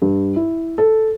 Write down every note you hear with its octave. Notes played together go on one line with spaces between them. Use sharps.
G2
E4
A4